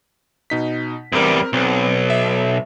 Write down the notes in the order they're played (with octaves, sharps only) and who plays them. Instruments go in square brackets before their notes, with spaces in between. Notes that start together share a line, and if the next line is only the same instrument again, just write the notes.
[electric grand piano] B2 D#4 B6
[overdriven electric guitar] E2 G3 [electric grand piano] C4 A#4
[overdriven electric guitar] B1 [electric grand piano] C4
[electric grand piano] E5